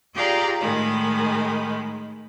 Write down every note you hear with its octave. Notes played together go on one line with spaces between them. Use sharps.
F4 G4 G#4 D5 F5 A#5
A2 D#3 G#3 B5